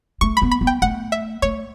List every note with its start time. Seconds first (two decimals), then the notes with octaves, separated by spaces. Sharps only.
0.21 A3 C#6
0.37 B3 B5
0.51 B5
0.61 B3
0.67 G5
0.82 A3 F#5
1.12 E5
1.42 A3 C#5